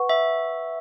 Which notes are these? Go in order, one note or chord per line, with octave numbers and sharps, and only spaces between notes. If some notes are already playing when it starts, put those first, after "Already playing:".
Already playing: B4 F#5 C#6
E5